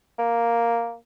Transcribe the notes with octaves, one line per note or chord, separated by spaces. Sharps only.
A#3